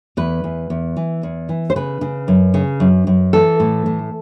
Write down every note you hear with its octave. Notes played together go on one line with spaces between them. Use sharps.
E2 B4
E2
E2
E3
E2
E3
C5
C#3 B4
C#3
F#2
C#3
F#2
F#2
E3 A4
A2
A2